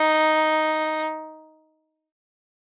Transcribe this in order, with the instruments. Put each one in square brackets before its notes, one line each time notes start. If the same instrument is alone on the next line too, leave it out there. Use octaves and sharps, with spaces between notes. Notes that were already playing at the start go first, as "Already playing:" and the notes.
Already playing: [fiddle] D#4